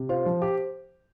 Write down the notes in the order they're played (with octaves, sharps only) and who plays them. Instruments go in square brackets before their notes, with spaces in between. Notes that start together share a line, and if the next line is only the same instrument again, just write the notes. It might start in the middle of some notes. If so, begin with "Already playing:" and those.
Already playing: [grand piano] C3
[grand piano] F4 [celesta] C5
[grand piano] F3
G4